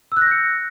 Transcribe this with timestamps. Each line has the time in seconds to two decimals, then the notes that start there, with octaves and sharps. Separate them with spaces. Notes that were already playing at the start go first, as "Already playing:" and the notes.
0.12 E6
0.17 F#6
0.21 A#6
0.26 G6
0.31 C#7